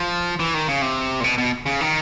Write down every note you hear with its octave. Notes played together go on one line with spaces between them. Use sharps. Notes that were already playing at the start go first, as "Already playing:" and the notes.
Already playing: F3
E3
D#3
C#3
C3
A#2
B2
B2
C#3
D#3